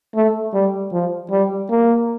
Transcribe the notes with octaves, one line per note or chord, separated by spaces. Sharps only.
A3
G3
F3
G3
A#3